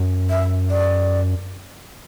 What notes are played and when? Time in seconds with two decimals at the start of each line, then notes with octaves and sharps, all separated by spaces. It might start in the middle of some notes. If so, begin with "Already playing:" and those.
Already playing: F#2
0.30 E5
0.70 D5